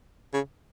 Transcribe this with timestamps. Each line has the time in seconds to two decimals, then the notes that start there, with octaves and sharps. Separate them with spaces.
0.33 C#3